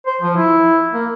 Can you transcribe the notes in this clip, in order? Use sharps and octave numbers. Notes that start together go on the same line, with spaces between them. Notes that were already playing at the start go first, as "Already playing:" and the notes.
C5
F3
E4
A#3